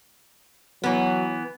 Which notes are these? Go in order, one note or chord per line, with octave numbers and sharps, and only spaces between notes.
E3 F#3 B3